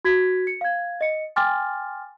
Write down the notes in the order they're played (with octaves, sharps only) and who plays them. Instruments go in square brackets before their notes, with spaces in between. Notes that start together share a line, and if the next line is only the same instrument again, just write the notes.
[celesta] F#4 G#6 B6
C#7
F5 G#6
D#5 C#7
G5 G#5 C6 D6 F6 A6